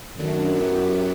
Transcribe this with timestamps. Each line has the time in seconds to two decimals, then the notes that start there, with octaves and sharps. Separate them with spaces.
0.18 F#2 D#3 F#3 A3 D4
0.56 F#3 B3 E4 G4